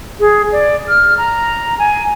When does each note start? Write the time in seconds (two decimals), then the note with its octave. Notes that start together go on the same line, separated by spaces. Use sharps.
0.20 G#4
0.52 D5
0.88 F6
1.18 A#5
1.79 G#5